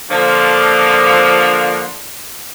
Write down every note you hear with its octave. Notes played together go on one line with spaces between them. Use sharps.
D3 F3 A#3